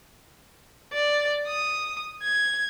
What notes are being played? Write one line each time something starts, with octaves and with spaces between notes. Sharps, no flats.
D5
D#6
G#6